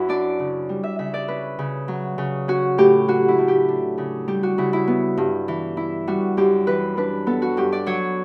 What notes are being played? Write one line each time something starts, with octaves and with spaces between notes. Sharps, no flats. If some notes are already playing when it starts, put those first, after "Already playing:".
Already playing: F#2 E4 F#4 B4
D4 D5
C#3
G3
E5
C#3 E5
D5
C#4 B4
C#3
F#3
C#3
C#4 F#4
A2 G4
F#3 F#4
E4
A2
G4
D4
C#3
G3 G4
F#4
C#3 E4
E4
B3
G2
E3
E4
G3 F#4
F#2 G4
E3 B4
D4 B4
B3 A4
F#4
G2 G4
D5
F#3 C#5